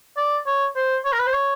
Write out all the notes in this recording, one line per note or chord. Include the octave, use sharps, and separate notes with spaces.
D5
C#5
C5
C#5
A#4
B4
C5
C#5